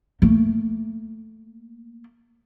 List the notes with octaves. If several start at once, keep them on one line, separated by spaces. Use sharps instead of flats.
A3 A#3